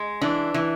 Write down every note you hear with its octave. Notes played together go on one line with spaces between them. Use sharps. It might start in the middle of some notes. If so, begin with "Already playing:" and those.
Already playing: G#3
E3 D4
E3